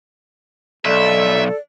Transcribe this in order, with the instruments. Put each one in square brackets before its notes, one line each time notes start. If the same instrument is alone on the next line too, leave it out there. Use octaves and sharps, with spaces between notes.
[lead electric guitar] B1 [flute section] A4 D5 [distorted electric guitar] E5